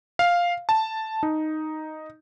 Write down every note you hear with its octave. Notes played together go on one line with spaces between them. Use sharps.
F5
A5
D#4